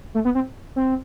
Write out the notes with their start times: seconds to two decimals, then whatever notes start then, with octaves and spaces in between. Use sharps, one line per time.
0.15 A3
0.25 B3
0.35 C4
0.76 C4